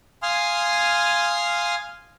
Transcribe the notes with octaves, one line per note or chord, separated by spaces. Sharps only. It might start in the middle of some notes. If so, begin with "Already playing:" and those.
F5 G#5 C6 D#6 F6